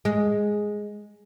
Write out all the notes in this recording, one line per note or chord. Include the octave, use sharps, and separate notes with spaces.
G#3